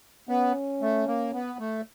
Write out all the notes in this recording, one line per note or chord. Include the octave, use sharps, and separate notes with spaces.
B3 C#4
A3
A#3
B3
A3